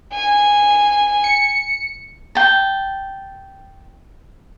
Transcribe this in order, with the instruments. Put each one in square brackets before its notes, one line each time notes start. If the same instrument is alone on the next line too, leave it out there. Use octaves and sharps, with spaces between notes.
[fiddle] G#5
[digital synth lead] C#7
[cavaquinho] G5 A5